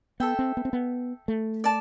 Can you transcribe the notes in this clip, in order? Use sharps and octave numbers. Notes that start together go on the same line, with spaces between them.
B3 A4 E5 G5
C4
B3
C4
B3
A3
D5 A5